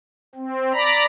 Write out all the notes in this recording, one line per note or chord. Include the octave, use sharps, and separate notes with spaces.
C4
D5 A#5 B5